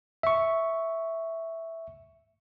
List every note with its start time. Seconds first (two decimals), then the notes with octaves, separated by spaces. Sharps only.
0.23 E5 C#6